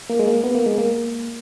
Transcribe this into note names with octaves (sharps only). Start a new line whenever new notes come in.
A#3
G#3
A#3
B3
A#3
G#3
A#3